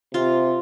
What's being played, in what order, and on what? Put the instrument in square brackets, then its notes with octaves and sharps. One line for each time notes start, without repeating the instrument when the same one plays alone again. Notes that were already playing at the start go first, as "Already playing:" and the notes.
[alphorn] C3 [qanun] F4